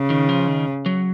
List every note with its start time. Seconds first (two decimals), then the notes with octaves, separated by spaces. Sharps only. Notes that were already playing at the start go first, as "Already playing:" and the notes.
Already playing: C#3
0.10 D#3
0.29 F3
0.48 D#3
0.86 F#3